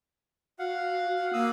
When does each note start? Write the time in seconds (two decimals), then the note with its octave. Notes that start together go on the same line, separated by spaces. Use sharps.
0.59 F#4 F5 F#5
1.17 F#4
1.33 A#3 F5 D#6 E6